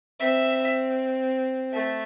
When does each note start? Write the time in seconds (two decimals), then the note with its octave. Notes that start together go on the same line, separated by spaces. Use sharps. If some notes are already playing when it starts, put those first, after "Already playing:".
0.20 C4 E5
1.73 A3 E5